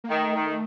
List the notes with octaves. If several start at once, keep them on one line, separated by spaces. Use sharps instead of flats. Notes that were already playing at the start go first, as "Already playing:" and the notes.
A#3
D#3 A3
D#3